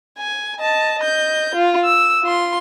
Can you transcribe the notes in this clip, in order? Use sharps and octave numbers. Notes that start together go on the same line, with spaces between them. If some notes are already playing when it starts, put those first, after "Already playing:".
G#5
D#5 A5
D#5 G6
F4
E6
F4 C6